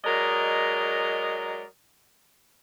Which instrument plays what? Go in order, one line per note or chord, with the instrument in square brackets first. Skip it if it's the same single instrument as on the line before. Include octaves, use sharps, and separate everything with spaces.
[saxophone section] F#3 G#3 A#4 D5 D#5